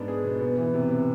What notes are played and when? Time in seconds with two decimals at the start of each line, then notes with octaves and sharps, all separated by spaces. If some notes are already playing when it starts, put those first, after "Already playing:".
Already playing: G#2 B3 D4
0.08 G#4
0.25 B2
0.41 B3
0.57 E3
0.74 C3
0.91 C3